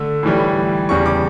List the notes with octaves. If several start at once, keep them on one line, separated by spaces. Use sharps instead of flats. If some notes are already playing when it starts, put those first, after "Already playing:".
Already playing: D3 A3 E6
A2 E3 G3
E2 C#3 G3 C#6
D6